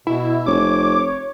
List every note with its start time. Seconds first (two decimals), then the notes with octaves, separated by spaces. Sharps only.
0.07 B2 E4
0.46 F1 C#5 D6